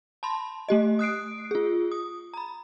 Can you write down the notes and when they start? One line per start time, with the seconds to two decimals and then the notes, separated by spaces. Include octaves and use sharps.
0.23 A5 B5 C6
0.68 A3 G4 D#5
0.99 D#6 F#6 C7 D7
1.51 F4 G#4
1.91 D#6
2.34 A#5 B5